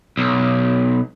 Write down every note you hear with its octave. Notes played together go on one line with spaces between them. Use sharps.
B1